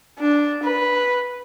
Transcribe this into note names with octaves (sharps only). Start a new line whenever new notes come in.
D4
B4